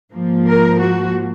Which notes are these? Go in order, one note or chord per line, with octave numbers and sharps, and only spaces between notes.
G#2 F3 A#3
A#4
F#4